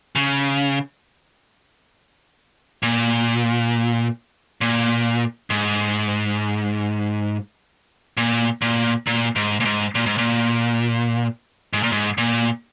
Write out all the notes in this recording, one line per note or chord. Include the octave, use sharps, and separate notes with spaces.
C#3
A#2
A#2
G#2
A#2
A#2
A#2
G#2
A#2
G#2
A#2
G#2
A#2
G#2
A#2
G#2
A#2